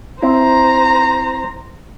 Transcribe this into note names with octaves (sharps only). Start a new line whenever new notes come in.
C4 E4 C5 A#5